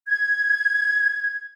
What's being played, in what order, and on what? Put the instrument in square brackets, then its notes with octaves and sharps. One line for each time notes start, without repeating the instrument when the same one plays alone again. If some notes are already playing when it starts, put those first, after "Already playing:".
[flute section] G#6